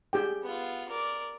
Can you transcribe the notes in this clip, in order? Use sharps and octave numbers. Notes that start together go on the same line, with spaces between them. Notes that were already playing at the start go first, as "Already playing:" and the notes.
G4 G#4 G5
B3 F4
A#4 D5